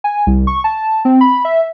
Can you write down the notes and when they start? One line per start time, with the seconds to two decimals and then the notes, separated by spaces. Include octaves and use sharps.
0.04 G#5
0.27 C2
0.47 C#6
0.64 A5
1.05 C4
1.21 B5
1.45 E5